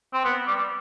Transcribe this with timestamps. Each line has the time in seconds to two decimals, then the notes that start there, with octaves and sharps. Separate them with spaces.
0.13 C4
0.24 B3
0.47 G3